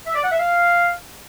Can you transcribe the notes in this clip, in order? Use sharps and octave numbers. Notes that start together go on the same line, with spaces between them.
E5
D5
F#5
E5
F5